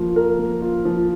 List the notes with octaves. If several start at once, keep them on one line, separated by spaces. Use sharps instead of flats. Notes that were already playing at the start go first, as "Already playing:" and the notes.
Already playing: F3 A#3 F4
A#4
A#3
F4
F3